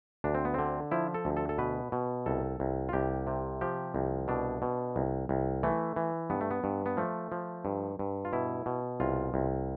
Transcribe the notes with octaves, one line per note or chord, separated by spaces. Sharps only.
D2 D4
C4
B3
D3 C4
F3 E4
A4
D2
A4
A4
B2 B4
B2
C2 A4
C2
F4
C2 G4
C3
F3 G4
C2
B2 D4
B2
C2
C2
E3 A3
E3
G2 B3
A3
B3
G2
B3
F3 A3
F3
G2
G2
F4
B2 E4
B2
C2 F4
C2